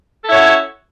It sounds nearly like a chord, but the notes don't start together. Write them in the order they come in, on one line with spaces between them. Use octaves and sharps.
A4 E4 C#4 C#5 F#4